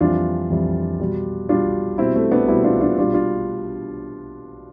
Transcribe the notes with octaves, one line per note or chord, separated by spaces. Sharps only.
F2 E3 G3 D4 F4
F2 E3 G3
B2 G3
B2 G3 D4 F4
B2 G3 C4 E4
A3 C4
B3 D4
B2 G3 C4 E4
D4 F4
D4 F4
B2 G3 D4 F4
D4 F4